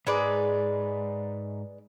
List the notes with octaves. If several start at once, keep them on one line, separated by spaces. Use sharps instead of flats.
G#2 G#3 B4 D5